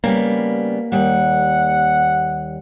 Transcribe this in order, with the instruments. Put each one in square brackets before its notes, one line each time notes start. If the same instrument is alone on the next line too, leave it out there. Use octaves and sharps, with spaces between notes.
[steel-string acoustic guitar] C#3 G3 B3 [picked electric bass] A#3
[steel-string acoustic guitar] D#2 G3 [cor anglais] F#5